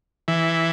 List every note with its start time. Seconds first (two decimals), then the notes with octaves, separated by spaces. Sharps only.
0.28 E3